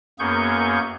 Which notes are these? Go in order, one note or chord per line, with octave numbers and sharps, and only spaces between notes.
F#2 A#3 B3 G#4 C#6 G6